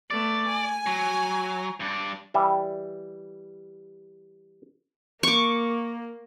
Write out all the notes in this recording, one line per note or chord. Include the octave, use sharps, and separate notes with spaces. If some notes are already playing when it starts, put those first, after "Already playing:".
A3 B3 D5
G#5
F#3
G2 D4
E3 G3 E5
A#3 C#6 D6